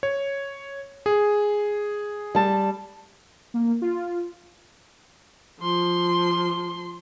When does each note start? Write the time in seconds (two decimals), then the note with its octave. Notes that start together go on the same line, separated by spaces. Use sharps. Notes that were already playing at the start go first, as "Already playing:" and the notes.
0.03 C#5
1.06 G#4
2.35 G3 A5
3.54 A#3
3.82 F4
5.60 F3 C6